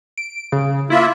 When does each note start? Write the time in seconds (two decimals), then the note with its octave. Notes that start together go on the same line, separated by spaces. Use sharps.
0.18 D7
0.52 C#3
0.90 A#3 E4 F4 E5